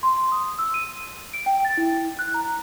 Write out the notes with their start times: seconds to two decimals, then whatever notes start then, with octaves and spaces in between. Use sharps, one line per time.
0.03 C6
0.32 D#6
0.59 E6
0.74 D#7
1.34 D7
1.46 G5
1.65 A6
1.77 E4
2.19 F#6
2.34 A#5